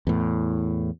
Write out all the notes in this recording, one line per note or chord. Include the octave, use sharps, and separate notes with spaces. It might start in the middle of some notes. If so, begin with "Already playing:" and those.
E2 A2